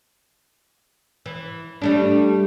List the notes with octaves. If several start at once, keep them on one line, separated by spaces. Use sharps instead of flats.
E3
G3 A3 D4